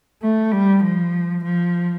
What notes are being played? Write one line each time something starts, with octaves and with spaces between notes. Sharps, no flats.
A3
G3
F3
F3